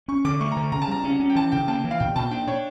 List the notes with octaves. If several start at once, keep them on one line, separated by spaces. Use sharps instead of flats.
C#4 C#6
D3 D6
A3 C#6
A#5
D3
C#3 A#5
A5
G3 A#5
C#4
C#4
G5
E3 A5
C#3 G5
A#3 A5
E3
F5
A#2 G5
A#2 A5
D4 G5
D4 C#5